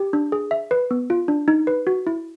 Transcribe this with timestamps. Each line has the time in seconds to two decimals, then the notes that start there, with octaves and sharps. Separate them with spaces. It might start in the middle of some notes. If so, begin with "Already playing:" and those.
Already playing: G4
0.13 D4
0.32 G#4
0.51 E5
0.71 B4
0.91 B3
1.10 F4
1.28 D4
1.48 D#4
1.67 B4
1.87 F#4
2.07 E4